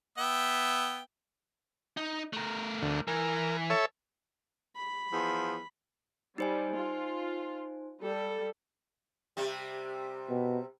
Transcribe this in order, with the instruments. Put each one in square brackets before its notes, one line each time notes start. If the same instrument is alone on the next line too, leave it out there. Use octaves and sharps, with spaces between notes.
[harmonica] B3 E5 G5
[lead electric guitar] D#4
A3 A#4
[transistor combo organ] D2
[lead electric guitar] E3 [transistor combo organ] A#4
[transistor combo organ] A4 C#5 E5
[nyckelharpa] B5
[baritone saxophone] E2 [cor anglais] F3
[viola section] G3 [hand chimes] D#4 C5 G#5
[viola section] F4
G3 A4
[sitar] C3 G3
[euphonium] B2